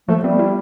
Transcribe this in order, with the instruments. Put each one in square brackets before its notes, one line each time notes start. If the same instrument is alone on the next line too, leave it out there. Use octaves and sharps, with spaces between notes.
[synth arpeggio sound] F3 [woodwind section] A3
[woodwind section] G3 [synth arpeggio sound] B3
[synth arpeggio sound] E4